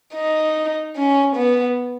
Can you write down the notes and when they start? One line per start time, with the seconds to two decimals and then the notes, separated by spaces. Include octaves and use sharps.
0.15 D#4
0.96 C#4
1.36 B3